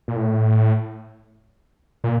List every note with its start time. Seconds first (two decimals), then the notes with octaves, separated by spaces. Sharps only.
0.08 A#2
0.16 A2
2.04 A#2